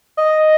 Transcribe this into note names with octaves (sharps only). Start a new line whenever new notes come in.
D#5